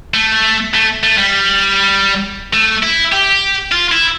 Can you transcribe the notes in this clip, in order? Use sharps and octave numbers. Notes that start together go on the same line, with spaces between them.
A3
A3
A3
G3
A3
E4
G4
F4
E4